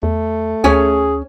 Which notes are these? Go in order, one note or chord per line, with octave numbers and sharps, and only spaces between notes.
E2 A3
D2 C#4 G#4 C#5 G#5